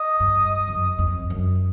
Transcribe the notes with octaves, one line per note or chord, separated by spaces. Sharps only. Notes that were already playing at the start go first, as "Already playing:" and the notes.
Already playing: D#5
G2
F#2
F2
F#2